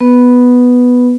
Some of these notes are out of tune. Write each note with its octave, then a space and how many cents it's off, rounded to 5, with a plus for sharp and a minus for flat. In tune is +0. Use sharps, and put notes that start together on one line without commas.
B3 +0 B4 +0